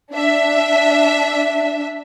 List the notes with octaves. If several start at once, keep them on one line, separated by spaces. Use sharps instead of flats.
D4 E5